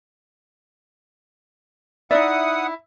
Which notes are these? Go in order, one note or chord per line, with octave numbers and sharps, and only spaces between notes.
D#4 E4 D5 E5 F#5 D#6